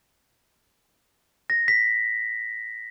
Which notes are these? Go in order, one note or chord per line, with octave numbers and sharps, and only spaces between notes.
A#6
B6